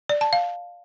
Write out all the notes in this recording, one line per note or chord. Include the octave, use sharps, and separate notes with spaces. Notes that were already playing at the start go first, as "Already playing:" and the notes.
D5
A5
F5